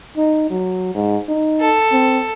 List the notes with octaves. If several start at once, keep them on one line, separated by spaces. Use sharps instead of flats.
D#4
F#3
G#2
D#4
A4
C4